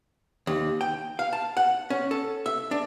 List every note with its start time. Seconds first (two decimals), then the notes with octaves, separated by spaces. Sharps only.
0.47 D#2
0.81 G5
1.19 F5
1.33 A5
1.57 F#5
1.90 C#4
2.11 A4
2.46 E5
2.71 D4